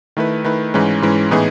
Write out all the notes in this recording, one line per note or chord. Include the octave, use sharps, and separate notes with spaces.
D#3 A3 E4 B4
D#3 A3 E4 B4
G#2 E3 G#3 C#4
G#2 E3 G#3 C#4
A2 E3 B3 D#4 G#4